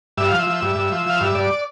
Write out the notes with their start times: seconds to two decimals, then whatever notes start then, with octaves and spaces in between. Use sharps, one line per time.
0.17 G2 E5
0.28 F3 F5
0.39 E5
0.47 F3
0.62 G2
0.76 G2
0.92 F3
1.06 F3 F5
1.21 G2 E5
1.35 G2 D5